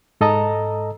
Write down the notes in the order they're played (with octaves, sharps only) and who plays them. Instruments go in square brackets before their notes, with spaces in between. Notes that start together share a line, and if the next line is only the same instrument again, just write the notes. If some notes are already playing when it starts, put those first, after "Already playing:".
[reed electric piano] G#2 A4 D#5 A5 A#5